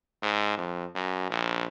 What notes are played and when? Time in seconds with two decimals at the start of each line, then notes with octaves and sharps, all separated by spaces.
0.22 G#2
0.57 F2
0.95 F#2
1.30 A#1